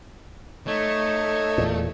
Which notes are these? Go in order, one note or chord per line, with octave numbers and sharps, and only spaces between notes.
A3 D#4 C#5
E2 A#2